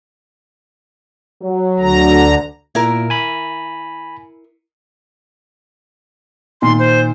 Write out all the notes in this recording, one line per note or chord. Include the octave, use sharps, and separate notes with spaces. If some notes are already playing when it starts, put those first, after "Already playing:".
F#3
D2 D3 A#5
A#2 E4 A#4
G#5 B5
A#2 D#3 C6
C5